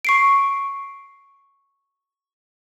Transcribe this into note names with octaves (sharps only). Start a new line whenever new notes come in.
C#6 C7 D7